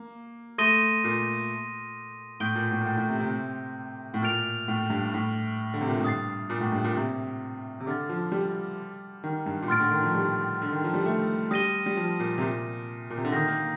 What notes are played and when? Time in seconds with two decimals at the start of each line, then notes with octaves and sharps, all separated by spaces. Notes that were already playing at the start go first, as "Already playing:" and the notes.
Already playing: A#3
0.58 A3 C6 D#6 A#6 D#7 G7
1.04 A#2
2.40 A2 D#6 G6 D7 G7
2.55 A#2
2.71 A2
2.81 A#2
2.86 A2
2.97 A2
3.09 C3
3.20 C3
4.14 A2
4.22 A#2 F6 A6 D7 F7
4.68 A2
4.90 G2
5.14 A2
5.74 D3
5.81 C3
5.89 A#2
5.97 A2
6.04 G2 D#6 A6 C7
6.50 A#2
6.61 A2
6.72 G2
6.84 A#2
6.95 C3
7.80 C3
7.86 D3 D6 F6 A6
8.09 F3
8.32 G3
9.24 D#3
9.46 G2
9.62 A#2
9.68 A2 C6 F6 A6 D7
9.80 D3
9.91 D#3
10.02 F3
10.14 G3
10.62 D3
10.72 D#3
10.84 F3
10.94 G3
11.06 A3
11.51 G3 D#6 A#6 D#7 G7
11.86 G3
11.97 F3
12.19 A#2
12.38 C3
12.41 A#2
13.10 A#2
13.18 C3
13.25 D3
13.32 D#3 D#6 G6 A#6
13.48 A#3